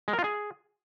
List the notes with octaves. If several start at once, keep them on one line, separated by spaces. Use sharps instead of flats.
G#3
A#4
F4
G#4